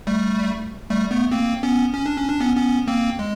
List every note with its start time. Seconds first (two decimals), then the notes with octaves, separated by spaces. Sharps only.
0.07 G3 A3
0.90 G3 A3
1.11 A3 B3
1.31 A#3 C4
1.63 B3 C#4
1.94 C#4
2.06 D4
2.17 C#4
2.29 D4
2.40 B3 C#4
2.57 B3 C#4
2.87 A#3 C4
3.19 G#3